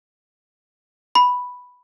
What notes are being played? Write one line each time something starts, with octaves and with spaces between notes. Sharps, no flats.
B5